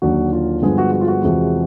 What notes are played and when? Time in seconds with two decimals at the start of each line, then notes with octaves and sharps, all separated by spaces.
0.02 D#2 D3 F#3 A#3 D4 F#4
0.33 F4
0.62 G2 D3 F3 G#3 B3 G#4
0.78 F#4
0.93 F#4
1.01 F4
1.08 F#4
1.22 E2 C3 F3 G#3